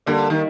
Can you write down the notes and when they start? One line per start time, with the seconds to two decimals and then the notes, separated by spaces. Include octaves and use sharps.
0.06 D3 G3 A#3
0.30 D#3